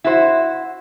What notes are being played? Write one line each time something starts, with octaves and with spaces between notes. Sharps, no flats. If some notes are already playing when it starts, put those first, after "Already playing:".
E4 F#4 C5